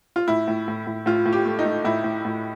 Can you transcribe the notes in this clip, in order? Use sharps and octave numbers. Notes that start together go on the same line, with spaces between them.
F4
A2 E4
A2
A2
A2
A2 F4
A2
G4
A3
D#4
A3
A2 E4
A2
A2